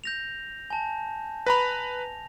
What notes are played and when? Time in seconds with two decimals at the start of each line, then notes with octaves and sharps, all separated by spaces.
0.04 G6 A#6 F7
0.70 G#5 A5
1.46 B4 A#5 B5 A#6 F7